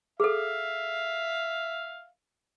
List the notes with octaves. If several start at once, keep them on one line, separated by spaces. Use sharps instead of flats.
G#4 A4 E5 F5